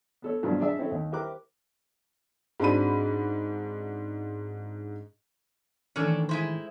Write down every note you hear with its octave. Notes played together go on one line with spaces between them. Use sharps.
B3 A4 C#5
G2 B2 F3 F#3 C4 D4
D4 G#4 D5 E5
C4 C#4 E4 A4
D#2
E4 G4 A#4 C5 D6 F#6
G#2 C4 D4 F#4 B5 D#7
A2 D#3 E3 C#4 D4 A4
G#3 E4 C5